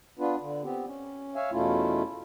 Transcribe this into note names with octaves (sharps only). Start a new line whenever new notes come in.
B3 D4 F4 B4
D3
B3 C4 G4
C#4
C#5 E5 F5 G#5
E2 B2 A3 C#4 E4 F4